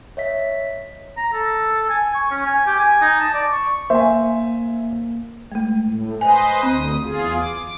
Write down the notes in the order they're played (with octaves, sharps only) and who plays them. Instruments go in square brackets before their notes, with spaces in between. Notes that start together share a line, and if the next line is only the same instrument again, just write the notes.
[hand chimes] C#5 D#5 E5 B6
[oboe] A#5
A4
G#5
C#6
C#4
G#5
G4
G#5
D#4
A5
D5
C#6
[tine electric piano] A#3 [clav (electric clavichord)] C5 [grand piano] E5 G#5
[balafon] G#3 A3
[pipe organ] A2
[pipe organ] B4 C5 D#5 [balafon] G#5
[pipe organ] D2 D#6 [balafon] C4
[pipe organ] E2 F4 G#4
D6